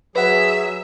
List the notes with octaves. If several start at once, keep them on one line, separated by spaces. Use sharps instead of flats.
F#3 G#4 B4 E5 F#5